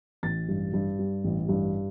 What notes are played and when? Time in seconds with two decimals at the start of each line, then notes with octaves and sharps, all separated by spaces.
0.23 A1 A6
0.49 G2
0.74 G2
0.99 G3
1.24 A1
1.49 G2